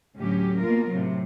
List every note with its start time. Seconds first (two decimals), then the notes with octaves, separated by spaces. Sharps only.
0.16 D2 A2 F#3 C#4 G4
0.61 B2 A#3 F4 A#4
0.90 A2 C3 F#3